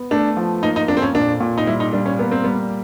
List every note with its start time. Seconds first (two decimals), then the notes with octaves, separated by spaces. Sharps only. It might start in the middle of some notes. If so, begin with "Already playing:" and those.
Already playing: B3
0.11 A3 D4
0.37 F3
0.63 A#3 D#4
0.76 D#4
0.88 F2 D4
0.97 C4
1.02 C#4
1.15 A#2 D4
1.40 A#2
1.58 D#4
1.67 G3 E4
1.80 D#4
1.93 G3 D4
2.06 C#4
2.19 A#3 B3
2.31 C4
2.44 G3 B3